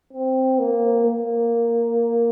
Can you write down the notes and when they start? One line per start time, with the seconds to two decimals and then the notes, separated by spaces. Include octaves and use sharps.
0.13 C4
0.59 A#3
1.06 A#3